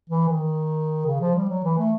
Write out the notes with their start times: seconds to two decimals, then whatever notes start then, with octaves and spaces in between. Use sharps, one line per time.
0.09 E3
0.29 D#3
1.06 C#3
1.21 F3
1.35 G3
1.49 F#3
1.64 E3
1.78 A3